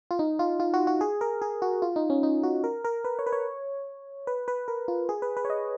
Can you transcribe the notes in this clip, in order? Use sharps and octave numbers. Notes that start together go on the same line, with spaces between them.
F4
D#4
F4
F4
F#4
F#4
G#4
A#4
G#4
F#4
F4
D#4
C#4
D#4
F#4
A#4
A#4
B4
C#5
B4
C#5
B4
B4
A#4
F4
G#4
B4
B4
C#5
D#5